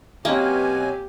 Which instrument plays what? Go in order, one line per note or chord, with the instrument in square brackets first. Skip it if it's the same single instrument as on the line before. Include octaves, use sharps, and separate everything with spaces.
[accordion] B2 F#3 G#5 [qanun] A#3 [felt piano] C4 C#4 D#5 [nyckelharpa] G4